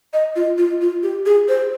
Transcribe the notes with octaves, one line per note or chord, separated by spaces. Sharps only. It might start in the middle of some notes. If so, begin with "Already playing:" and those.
D#5
F4
F4
F4
G4
G#4
C5